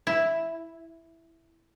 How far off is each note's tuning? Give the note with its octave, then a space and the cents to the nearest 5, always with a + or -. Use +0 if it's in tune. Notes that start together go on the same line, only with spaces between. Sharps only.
E4 +0